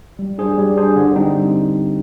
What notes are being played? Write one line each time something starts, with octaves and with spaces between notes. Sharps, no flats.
G3
D4 G#4 C5
G3
D4 G#4 C5
D3
G3 C4 D#4